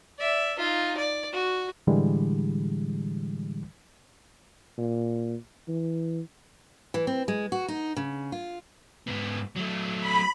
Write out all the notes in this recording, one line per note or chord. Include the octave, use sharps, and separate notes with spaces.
D5 E5
D#4 F4
D5
F#4
A2 D3 E3 G3 G#3
A#2
E3
E3
C4
G#3
F#4
D#4
C#3
F4
G#2 B3
F#3 A3
B5